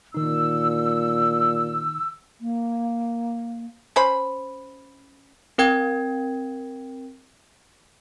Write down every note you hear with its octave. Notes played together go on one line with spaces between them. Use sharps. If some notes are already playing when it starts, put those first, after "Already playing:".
A#2 D#3 D#4 E6
A#3
C#4 C5 B5
C4 A#4 G5 G#6